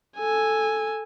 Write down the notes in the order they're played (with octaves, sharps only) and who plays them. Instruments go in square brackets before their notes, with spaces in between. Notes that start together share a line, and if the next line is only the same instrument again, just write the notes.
[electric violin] A4 G#5